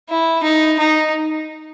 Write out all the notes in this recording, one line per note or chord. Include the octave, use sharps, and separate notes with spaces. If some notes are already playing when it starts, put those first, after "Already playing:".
E4
D#4
D#4